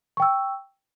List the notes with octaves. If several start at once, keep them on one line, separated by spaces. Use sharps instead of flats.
G5 C#6 E6